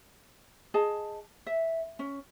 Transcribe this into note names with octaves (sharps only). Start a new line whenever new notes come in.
G#4 D#5 A5
E5
C#4